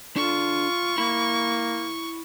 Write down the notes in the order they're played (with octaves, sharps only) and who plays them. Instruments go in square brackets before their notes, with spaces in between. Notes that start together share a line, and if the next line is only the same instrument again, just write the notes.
[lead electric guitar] D4 A4 [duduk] F4 [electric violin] C#6
[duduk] A#3 [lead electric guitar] E4 B5